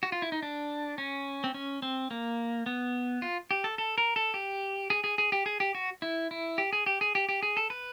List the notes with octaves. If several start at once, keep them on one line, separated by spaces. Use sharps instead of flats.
F#4
F4
E4
D#4
D4
C#4
C4
C#4
C4
A#3
B3
F4
G4
A4
A4
A#4
A4
G4
G#4
G#4
G#4
G4
G#4
G4
F#4
E4
E4
G4
G#4
G4
G#4
G4
G4
G#4
A4
B4